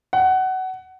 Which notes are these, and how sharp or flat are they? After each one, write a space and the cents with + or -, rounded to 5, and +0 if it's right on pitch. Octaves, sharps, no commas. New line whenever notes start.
F#5 +20